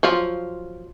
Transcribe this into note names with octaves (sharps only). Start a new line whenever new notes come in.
F3 F#3 F4